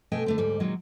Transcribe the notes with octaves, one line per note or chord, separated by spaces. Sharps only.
B2 A3 D#5 G5 G#5
D3 A3 C4
D2 G#2 G3
A#2 D#3 F#3 G#3 A#3